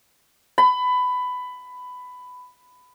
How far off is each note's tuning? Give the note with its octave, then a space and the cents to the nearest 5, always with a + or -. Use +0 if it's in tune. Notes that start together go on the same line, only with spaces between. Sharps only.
B5 +15